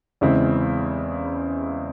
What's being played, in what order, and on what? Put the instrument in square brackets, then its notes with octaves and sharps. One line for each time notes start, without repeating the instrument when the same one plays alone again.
[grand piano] E2 C#3 G#3 C4 E4